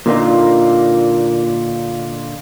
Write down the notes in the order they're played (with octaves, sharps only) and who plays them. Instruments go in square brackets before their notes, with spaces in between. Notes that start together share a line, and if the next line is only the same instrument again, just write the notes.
[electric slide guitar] A#2 D3 A#3 B3 D#4 F4